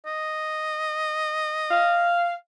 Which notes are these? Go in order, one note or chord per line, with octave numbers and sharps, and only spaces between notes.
D#5
F5